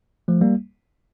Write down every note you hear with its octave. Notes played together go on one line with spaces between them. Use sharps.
F3 A3
G3 A#3